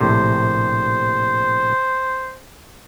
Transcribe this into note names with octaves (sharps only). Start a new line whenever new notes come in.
A#1 A2 C3 C5